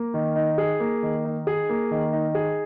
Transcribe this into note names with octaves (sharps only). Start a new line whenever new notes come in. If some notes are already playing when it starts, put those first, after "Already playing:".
Already playing: A#3
D#3
D#4
G#4
A#3
D#3
D#4
G#4
A#3
D#3
D#4
G#4